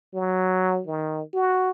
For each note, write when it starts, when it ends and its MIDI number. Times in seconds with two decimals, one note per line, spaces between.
0.14 0.81 54
0.87 1.22 51
1.34 1.71 66